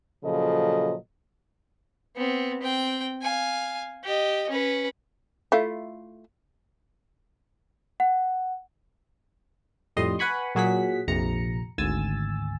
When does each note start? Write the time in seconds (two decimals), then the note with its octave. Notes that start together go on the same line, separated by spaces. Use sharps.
0.25 A#2 C#3 F3 F#3 A4 D#5
2.16 B3 C4
2.62 C4 G5
3.22 F5 G#5
4.04 G4 D#5
4.49 C#4 B4
5.52 A3 E4 F4
8.00 F#5
9.97 F2 A2 G3 D#5 C6
10.19 B4 F#5 G#5 B5 C#6
10.55 A#2 F#3 G#4 F#5 B6
11.08 A#1 F2 C3 A#5 C#7
11.78 G#1 D2 G#5 E6 A6